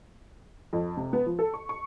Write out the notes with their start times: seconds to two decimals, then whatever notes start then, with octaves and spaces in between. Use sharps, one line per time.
0.73 F2
0.97 C3
1.13 B3
1.26 F3
1.39 A4
1.54 C#6
1.69 C#6